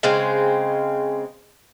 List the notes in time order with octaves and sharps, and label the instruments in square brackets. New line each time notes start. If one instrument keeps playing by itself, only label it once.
[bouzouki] C#3 G#3 C4